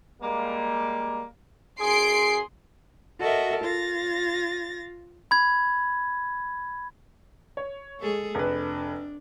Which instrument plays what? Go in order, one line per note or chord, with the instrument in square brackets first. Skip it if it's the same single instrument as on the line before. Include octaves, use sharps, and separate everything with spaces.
[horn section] G3 G#3 A#3
[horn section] F#2 G#4 [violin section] C6 C7 D7
[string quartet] F#4 A4 A#4 D#5 E5
F4 A6 A#6
[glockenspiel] B5 G#6
[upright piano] C#5
[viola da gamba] G#3 G#4 A4
[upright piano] F1 B4 [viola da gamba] D4